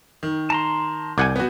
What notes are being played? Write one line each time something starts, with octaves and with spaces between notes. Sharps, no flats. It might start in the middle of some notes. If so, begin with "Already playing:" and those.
D#3
A5 A#5 C6
C2 F#5 G#5 D6 G6 G#6
B3 F#4